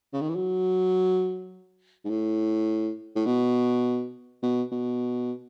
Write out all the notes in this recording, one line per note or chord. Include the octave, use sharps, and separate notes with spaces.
C#3
D#3
E3
F#3
G#2
A2
A2
B2
B2
B2